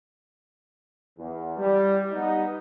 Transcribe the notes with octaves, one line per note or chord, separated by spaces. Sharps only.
E2
G3
G3 B3 D#4